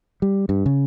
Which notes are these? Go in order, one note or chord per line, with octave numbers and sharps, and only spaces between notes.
G3
G2
C#3